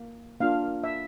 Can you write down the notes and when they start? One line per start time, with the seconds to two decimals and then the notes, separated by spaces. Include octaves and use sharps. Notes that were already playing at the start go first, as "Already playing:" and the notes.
Already playing: A#3
0.40 A#3 D4 F4 F5
0.84 E5